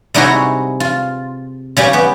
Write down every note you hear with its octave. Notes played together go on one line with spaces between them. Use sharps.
C3 G3 D#4 E4 F#4 G#4
F4
C#3 G3 C#4 G4
B3 G4